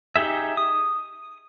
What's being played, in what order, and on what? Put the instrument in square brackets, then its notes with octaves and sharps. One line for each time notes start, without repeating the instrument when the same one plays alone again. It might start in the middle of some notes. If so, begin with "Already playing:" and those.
[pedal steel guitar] D#4 G4 G#4 E5
D#6